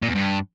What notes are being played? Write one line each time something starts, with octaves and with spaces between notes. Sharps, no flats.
A#2
E2
G2